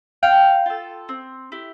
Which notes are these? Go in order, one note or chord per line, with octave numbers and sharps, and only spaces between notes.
C4 F5 G5
F4 A4
C4
E4 G4